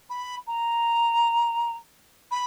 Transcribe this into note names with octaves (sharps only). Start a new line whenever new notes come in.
B5
A#5
B5